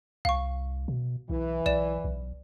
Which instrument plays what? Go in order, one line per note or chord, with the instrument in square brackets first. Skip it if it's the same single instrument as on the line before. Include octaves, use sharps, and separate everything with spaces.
[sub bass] C2 [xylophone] F5 C#6
[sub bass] B2
[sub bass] B1 [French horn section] E3
[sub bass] B1 [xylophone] D5 E7
[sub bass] B1